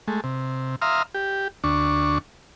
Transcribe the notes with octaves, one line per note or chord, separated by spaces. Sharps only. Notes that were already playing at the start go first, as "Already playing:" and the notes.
G#3 A3
C3
E5 F5 A#5 C6 D#6 F6
G4
D2 D4 C#6